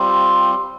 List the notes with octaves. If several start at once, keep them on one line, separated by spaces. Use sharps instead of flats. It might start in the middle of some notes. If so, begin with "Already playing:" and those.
Already playing: G3 C4 F4